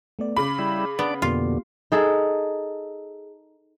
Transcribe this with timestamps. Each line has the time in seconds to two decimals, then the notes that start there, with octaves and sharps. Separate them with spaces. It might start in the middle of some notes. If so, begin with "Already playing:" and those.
0.19 A3 B3 D5
0.36 C#3 B5 D6
0.59 G3 E4
0.99 B3 D4 D5
1.22 F2 B2 D3 A#3 B3 F4 G4
1.92 D#4 G#4 A4